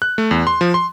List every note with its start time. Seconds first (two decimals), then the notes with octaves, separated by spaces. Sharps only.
0.02 F#6
0.18 A3
0.31 E2
0.47 C6
0.61 F3
0.74 C6